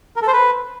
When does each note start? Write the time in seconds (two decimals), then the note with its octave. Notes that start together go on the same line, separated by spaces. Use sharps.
0.16 A#4
0.22 A4
0.27 C5
0.33 B4